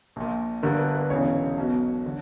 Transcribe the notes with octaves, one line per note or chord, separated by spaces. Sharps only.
A#1 A#2
G1 G2 D3 A#4
B4
B4
E1 E2 C#3 E3 C#5
B1 B2
D3